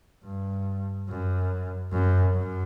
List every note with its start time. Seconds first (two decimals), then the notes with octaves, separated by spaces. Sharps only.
0.24 G2
1.08 F#2
1.91 F#2
2.34 F#2